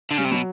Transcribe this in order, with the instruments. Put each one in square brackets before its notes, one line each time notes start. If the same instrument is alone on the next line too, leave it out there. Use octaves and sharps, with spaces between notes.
[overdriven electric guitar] D3
[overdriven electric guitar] C#3 [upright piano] G3
[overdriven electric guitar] C3
[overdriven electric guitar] B2 [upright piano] F#3